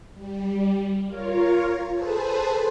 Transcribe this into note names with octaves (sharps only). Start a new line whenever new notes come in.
G3
F4 A#4 C#5
G#4 A4 B4 C5 A5